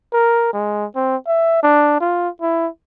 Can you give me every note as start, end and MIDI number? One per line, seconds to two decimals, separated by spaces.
0.13 0.51 70
0.53 0.85 56
0.96 1.16 60
1.27 1.59 76
1.63 1.97 62
2.00 2.29 65
2.41 2.68 64